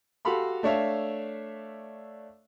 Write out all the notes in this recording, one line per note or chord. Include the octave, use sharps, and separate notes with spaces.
F#4 G4 A4 F5 B5 C6
A3 D4 C#5 E5 F5